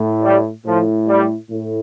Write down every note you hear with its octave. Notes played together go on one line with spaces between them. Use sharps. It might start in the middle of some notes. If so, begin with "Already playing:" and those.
Already playing: A2
G3
A2 F3
G3
A2